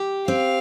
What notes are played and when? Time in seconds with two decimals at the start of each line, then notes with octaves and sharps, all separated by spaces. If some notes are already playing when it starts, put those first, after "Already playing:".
Already playing: G4
0.28 C4 F5